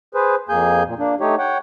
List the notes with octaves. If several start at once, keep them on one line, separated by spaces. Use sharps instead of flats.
G#4 B4 C5
F2 A#3 G#4 G#5 G6
A#2
A#3 D4
A3 D#4 G4 C#5
C#5 F#5 G5